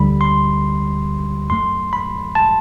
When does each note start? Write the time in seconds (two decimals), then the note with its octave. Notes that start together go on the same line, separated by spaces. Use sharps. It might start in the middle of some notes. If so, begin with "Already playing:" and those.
Already playing: D2 D3 G3 B5
0.21 C6
1.50 F#2 F#3 A3 C6
1.93 B5
2.35 A5